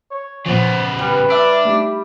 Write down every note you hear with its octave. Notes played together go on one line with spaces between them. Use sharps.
C#5
A#2 C#3 F3 B3 C5
G3 B4
D4 E5
A3 D#4 G4